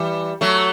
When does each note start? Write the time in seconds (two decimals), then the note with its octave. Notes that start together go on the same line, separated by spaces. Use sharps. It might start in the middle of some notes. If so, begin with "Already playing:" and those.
Already playing: E3 G3
0.41 F#3 A3